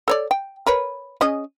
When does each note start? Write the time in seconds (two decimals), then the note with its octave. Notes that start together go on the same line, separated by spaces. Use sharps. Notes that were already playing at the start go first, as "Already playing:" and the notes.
0.08 A4 C#5 D5
0.31 G5
0.66 A#4 B4 C#5
1.21 C#4 G#4 D#5